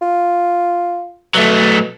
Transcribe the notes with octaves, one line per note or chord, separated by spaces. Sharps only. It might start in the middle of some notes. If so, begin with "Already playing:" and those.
F4
B2 F#3 A3